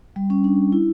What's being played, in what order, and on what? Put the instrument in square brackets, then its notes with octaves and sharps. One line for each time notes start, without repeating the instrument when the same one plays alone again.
[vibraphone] G3
C#4
D4
E4